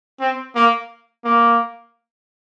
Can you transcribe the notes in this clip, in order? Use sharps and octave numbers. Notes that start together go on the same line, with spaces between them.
C4
A#3
A#3